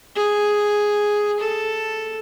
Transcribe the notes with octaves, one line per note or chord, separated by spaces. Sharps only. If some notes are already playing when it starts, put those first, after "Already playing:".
G#4
A4